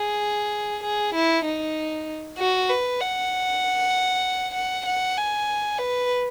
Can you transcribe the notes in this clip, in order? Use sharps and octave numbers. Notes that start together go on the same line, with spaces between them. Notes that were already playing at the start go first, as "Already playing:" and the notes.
Already playing: G#4
G#4
E4
D#4
F#4
B4
F#5
F#5
F#5
G#5
B4